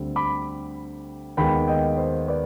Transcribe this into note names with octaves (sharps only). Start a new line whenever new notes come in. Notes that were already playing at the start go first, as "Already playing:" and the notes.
Already playing: D2 D3 G3 C4
B5 D6
D#2 D#3 G#3 B3 G5 B5
D#5 G5
C5 D#5
B4 D5